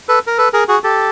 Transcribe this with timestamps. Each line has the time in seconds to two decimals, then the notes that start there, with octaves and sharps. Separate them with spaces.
0.09 A4 B4
0.27 A#4
0.38 A4 B4
0.53 G#4 A#4
0.68 F#4 G#4
0.84 G4 A4